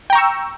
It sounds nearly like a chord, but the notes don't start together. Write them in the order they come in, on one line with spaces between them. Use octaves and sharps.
G5 A#5 C#6 E6